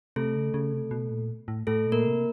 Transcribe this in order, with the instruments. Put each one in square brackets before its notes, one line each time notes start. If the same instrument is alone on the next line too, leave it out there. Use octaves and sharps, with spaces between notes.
[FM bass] C3 [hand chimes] A3 A4
[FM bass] C#3
C#3
C3
B2
A#2
A2
[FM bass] A2 [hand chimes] A3 A4
[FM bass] A#2
[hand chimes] A#3 A#4
[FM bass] C3